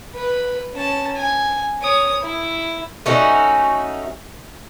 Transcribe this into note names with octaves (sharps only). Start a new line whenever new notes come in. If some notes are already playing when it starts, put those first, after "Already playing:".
B4
C#4 A5
G#5
C#5 D#6
E4
A3 C#4 D#4 F#4